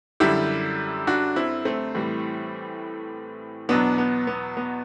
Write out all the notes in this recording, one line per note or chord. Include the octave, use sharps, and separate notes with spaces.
F#2 D3 G3 E4 G4
D4 F#4
C4 E4
A3 C4
A2 E3 G3
E2 B2 F#3 B3 D4
B3
B3
B3